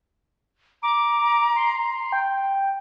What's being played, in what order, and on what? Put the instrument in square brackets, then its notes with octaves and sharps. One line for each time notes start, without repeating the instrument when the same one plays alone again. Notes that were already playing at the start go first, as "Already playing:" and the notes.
[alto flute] A#5 [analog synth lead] D6
[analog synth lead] C6
G5